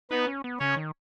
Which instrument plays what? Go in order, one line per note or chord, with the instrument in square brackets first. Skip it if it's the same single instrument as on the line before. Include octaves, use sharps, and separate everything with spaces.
[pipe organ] B3 B4 [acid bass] D#4
[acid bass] C#4
B3
[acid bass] C#3 [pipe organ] C#4 C#5
[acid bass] D#3